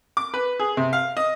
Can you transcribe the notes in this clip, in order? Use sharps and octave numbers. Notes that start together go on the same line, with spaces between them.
D6
B4
G#4
C3
F5
D#5